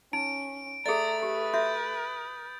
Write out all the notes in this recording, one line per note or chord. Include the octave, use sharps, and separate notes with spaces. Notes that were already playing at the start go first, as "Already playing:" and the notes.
C#4 D#4 D7
A3 G#4 D5 A#5 D#6 A6
G4 B4
F#4 E5 G6